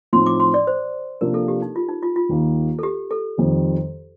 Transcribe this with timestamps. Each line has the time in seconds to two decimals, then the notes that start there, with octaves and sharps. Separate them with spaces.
0.13 A2 F3 C4 D#4 C6
0.26 D6
0.40 C6
0.54 D5
0.67 C5
1.21 C3 F3 A#3 D4 F4 A#4
1.34 A4
1.48 G4
1.62 D#4
1.76 F4
1.89 D#4
2.03 F4
2.16 F4
2.29 D#2 D#3 A#3
2.79 A4
2.83 G4
3.11 A4
3.38 F2 D#3 G3